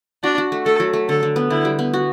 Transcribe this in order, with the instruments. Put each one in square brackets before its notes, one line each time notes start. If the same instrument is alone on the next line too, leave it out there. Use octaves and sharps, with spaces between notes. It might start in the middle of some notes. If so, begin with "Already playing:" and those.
[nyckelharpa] D4 [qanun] F#4
[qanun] F#4
A3
[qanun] A3 [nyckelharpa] A4
[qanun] F#3
A3
[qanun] D3 [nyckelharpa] A4
[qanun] D3
B3
[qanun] D3 [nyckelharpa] E4
[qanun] G3
B3
F#4